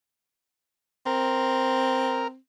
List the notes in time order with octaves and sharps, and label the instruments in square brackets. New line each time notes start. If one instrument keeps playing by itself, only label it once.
[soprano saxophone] C4 [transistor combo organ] A#4